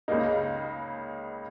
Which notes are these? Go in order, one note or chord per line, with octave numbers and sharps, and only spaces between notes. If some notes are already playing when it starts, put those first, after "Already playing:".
C#2 C#3 A#3 D#4